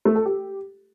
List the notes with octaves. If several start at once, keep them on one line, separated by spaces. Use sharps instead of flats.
A3
A4
G4